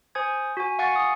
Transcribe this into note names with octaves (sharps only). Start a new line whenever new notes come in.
C5 G#5 D#6 G#6
F#4 G#5
F5 F#5 G#5 C#6 A6 C#7
G#5 D#6